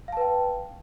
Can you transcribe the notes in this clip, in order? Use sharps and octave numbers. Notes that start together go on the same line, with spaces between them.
B4 F5 G5 A5